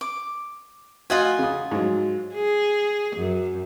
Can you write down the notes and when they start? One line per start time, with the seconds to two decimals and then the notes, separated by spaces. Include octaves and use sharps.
0.01 D6
1.10 F4 F#4 D#5 F5 F#5 G#5
1.39 C#3 D#6
1.71 G#2 F#3
2.34 G#4
3.16 F#2